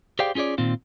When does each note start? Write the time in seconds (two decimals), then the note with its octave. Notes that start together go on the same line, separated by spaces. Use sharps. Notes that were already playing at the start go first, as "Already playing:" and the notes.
0.19 G4 G#4 C5 D5 F5 G5
0.35 C#4 F4 G#4 C#5 D5
0.58 A#2 D#3 C4 F4